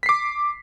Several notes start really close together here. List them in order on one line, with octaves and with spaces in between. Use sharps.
B6 C7 D6